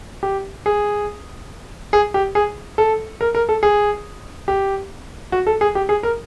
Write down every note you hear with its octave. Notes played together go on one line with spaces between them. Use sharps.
G4
G#4
G#4
G4
G#4
A4
A#4
A#4
A4
G#4
G4
F#4
A4
G#4
G4
G#4
A#4